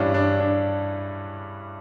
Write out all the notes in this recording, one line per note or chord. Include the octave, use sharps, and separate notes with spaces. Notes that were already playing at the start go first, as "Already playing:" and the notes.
Already playing: G2 E3 G3 C#4 D4 E4
D4
D4